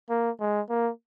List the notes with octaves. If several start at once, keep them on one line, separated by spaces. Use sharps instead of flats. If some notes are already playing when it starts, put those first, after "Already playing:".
A#3
G#3
A#3